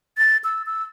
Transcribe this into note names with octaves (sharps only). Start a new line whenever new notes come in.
A6
E6
E6